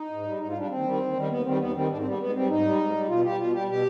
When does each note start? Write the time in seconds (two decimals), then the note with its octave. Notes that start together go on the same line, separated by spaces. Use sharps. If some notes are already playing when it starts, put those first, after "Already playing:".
Already playing: D#4
0.09 G#2
0.23 G3
0.38 G#2 D#4
0.49 F4
0.53 G3
0.58 D4
0.68 D#2 C4
0.83 D#3 G3
0.99 D#2
1.14 D#3 G3
1.22 C4
1.28 D#2 B3
1.43 D#3 G3 C4
1.58 D#2 B3
1.73 D#3 G3 C4
1.88 G#2 D4
1.98 C4
2.03 G3 B3
2.18 G#2 B3
2.32 G3 C4
2.48 G#2 D#4
2.63 G3
2.78 G#2
2.92 G3
3.08 B2 F4
3.23 G3 G4
3.38 B2 F4
3.52 G3 G4
3.67 B2 G4